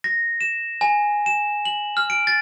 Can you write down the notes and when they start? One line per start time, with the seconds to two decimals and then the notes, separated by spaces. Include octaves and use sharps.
0.04 A#6
0.41 E7
0.81 G#5
1.26 E7
1.65 F#7
1.97 F6
2.10 D7
2.27 A6